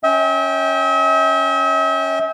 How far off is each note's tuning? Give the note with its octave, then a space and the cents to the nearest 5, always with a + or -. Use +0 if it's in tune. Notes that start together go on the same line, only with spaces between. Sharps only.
C#4 +0 E5 -45 G5 +0